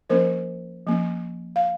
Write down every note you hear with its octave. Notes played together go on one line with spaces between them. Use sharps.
F3 A#3 C#4 A#4 C5
F3 A#3 C#4
F5